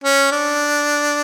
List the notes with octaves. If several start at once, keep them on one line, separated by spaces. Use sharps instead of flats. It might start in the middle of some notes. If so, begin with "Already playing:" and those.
C#4
D4